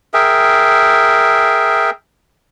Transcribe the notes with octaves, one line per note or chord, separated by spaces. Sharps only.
G#4 A#4 E5 G5